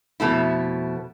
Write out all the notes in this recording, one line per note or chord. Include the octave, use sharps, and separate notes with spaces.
F2 B2 A3 E4